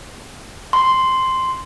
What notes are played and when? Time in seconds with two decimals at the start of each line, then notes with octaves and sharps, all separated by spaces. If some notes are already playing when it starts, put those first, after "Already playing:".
0.73 C6